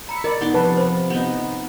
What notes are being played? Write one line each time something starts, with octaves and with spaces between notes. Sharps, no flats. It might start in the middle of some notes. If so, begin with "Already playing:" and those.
A#5 B5 E6 C#7
A#4 D5 D#5
A2 B3 D#4 C6 D6
C3 F3 B4 A5
C5 B5
B3 D#4